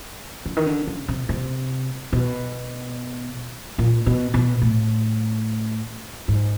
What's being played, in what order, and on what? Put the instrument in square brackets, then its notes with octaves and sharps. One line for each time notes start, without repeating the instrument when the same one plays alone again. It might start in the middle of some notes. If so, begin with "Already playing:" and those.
[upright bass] C#3
D#3
D3
C#3
C3
C3
B2
A#2
B2
B2
A2
G#2